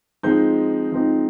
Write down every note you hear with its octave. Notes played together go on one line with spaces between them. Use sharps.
F3 G#3 C4 D#4 G6
F3 G#3 C4 D#4